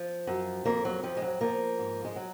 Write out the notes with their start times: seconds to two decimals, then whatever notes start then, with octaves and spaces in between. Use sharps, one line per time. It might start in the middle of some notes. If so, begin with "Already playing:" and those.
Already playing: F3
0.27 F#2
0.65 F2 A#3
0.85 F#3
1.03 F2 F3
1.17 G#3
1.22 F#3
1.41 F3 A#3
1.79 G#2
2.05 G#3
2.16 F#3